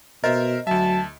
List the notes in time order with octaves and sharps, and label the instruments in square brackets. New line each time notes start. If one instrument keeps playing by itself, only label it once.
[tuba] B2 [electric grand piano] A#4 C5 E5 [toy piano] D#5
[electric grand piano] D2 E5 [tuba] F#3 [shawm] A5